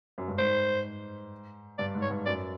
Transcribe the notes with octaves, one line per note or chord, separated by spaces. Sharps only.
F#2
G2
G#2 C5
G2 D5
G#2
C#5
G2
F#2 D5